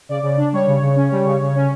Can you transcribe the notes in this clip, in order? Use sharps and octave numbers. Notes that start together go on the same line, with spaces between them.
C#3 D5
C#3
D4
G3 C#5
C#3
C#3
C#4
G3
C#3
C#3
C#4